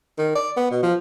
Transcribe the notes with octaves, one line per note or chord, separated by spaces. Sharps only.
D#3
D5
B3
B2
F3